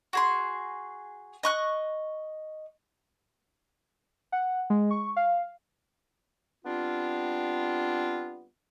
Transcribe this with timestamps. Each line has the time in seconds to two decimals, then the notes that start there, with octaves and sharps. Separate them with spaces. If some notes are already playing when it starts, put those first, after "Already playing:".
0.13 F#4 G#4 C6
1.43 D#5 C#6 F#6
4.32 F#5
4.70 G#3
4.91 C#6
5.16 F5
6.65 G3 B3 C4 D4 F4